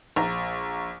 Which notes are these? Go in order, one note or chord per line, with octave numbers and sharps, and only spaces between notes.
A#1 A#5